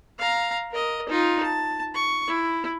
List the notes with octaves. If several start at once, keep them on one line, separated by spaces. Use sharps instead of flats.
F5 A#5
A#4 D#5
D#4 F4
A5
C#6
E4